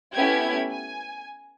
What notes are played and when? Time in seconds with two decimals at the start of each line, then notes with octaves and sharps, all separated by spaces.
0.13 A3 B3 C#4 E4 G4 G#6
0.70 G#5